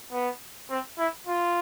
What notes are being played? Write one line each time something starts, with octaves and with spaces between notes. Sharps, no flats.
B3
C4
E4
F4